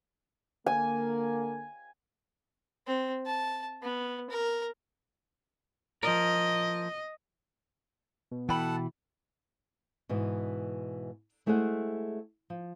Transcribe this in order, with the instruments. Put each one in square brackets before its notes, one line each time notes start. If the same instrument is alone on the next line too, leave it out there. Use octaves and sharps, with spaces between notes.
[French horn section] D3 A#3 [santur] G#5
[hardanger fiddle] C4
A5
B3
A#4
[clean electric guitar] F3 A#4 [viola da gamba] D#5
[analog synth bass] B2
[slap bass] E3 [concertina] A4 F#5 A5 [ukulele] G5 B5
[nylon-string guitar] G#2 B2 E3
G#3 A3 E4 G#4 C5 F#5
F3